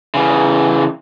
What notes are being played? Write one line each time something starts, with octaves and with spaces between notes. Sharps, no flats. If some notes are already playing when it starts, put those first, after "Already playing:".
C#3 E3